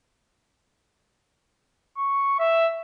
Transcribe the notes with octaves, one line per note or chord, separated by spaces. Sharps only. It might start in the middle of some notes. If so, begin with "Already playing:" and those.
C#6
E5